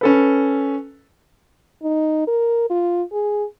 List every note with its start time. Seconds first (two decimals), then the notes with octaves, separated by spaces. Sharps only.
0.01 C#4 A4 B4
1.83 D#4
2.27 A#4
2.70 F4
3.12 G#4